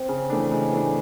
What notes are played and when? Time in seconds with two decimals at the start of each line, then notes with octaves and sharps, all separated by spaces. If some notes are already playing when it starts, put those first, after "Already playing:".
Already playing: C4
0.09 C#3
0.30 E3 A3 D4
0.51 C#3 G#3
0.72 E3 A3 D4